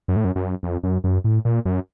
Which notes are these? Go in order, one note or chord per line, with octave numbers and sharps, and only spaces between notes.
F#2
A2
F#2
F#2
F2
F#2
F#2
A2
A#2
F#2